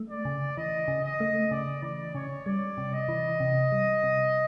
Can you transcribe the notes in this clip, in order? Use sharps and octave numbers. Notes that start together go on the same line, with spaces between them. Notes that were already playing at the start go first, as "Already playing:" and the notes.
Already playing: A3
D5
C#3
E3 D#5
C#3
D#5
A3
C#3 D5
E3 D5
C#3 C#5
G3 D5
C3
D#5
E3
C3
G3
C3